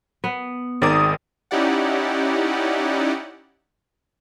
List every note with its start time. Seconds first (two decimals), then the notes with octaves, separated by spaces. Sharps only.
0.24 B3
0.82 G#1 D#3 G#4 A#4 D5 D#6
1.51 C#4 D#4 E4 G4 D5 F#5